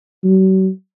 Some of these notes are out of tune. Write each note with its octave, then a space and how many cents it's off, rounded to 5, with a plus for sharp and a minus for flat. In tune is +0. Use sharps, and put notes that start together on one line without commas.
F#3 +40